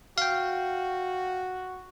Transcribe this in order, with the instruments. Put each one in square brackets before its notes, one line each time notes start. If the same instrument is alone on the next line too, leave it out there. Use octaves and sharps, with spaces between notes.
[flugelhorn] F#4 [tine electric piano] F5 G5